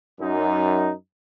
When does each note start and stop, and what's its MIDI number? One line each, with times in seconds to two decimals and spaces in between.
0.20 0.92 42
0.20 0.92 63